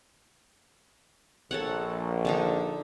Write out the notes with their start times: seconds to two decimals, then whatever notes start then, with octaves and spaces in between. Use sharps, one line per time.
1.51 A#1 A4 C#5 F#5
2.25 D3 D4 D#4